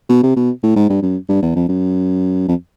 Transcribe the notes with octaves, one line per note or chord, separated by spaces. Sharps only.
B2
C3
B2
A2
G#2
G2
F#2
G2
E2
F2
F#2
F2